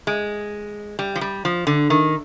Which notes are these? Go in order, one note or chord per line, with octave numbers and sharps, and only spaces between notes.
G#3
G3
F3
G3
F3
D3
D#3